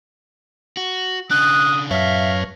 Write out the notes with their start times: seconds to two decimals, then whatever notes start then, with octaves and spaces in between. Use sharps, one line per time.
0.77 F#4
1.31 C#3 D4 D#6 F#6
1.91 F#2 B4 C#5 E5 F5 A5